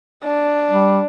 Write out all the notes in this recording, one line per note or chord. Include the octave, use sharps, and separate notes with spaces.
D4
G3